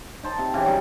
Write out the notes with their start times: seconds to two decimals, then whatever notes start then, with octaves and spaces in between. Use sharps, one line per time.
0.23 D#4 C5 A5
0.38 C3
0.54 C#3 E3 G4
0.65 F#3 G3 D#4 D5